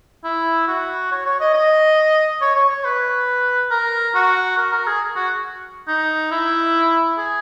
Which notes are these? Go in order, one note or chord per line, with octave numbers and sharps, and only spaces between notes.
E4
F#4
C#5
C#5
D#5
D#5
C#5
C#5
C#5
B4
A#4
F#4
A#4
A#4
G#4
F#4
D#4
E4
G#4